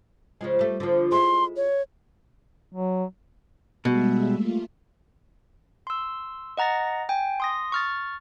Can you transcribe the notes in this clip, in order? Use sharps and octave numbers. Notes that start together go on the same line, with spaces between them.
C#3 F3 G#3
G3 A3
D3 F3
G#3 E4 C6
C#5
F#3
B2 G3 G#3 E5
A3 A#3 F4
C6 E6
D#5 F#5 A#5 A6 A#6
G5 G#5
C6 D#6 A#6
C#6 F6 A6